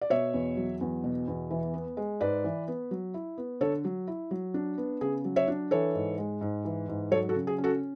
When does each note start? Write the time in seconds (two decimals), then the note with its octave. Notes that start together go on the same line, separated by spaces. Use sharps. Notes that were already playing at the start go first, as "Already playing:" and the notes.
0.01 D5
0.10 B2 C#5 E5
0.34 E2
0.57 F#3
0.81 E2
1.04 B2
1.28 E2
1.50 E3
1.74 B3
1.97 G#3
2.21 G#2 B4 D5
2.44 E3
2.68 B3
2.91 F#3
3.14 E4
3.38 B3
3.61 D3 A4 C#5
3.85 F#3
4.07 E4
4.31 F#3
4.54 D4
4.78 B3
5.01 C#3 G#4
5.25 F#3
5.36 C#5 E5
5.48 D4
5.71 E3 A4 C#5
5.95 G#2
6.18 G#3
6.41 G#2
6.65 E3
6.88 G#2
7.11 F#3 A4 C#5
7.29 F#4 A4
7.35 C#3
7.47 G#4
7.58 C#4
7.64 F#4 A4